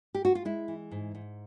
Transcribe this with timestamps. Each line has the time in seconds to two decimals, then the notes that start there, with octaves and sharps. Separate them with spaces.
0.14 G4
0.25 F#4
0.35 F4
0.45 G#3 E4
0.68 E3
0.91 G#2
1.15 G#2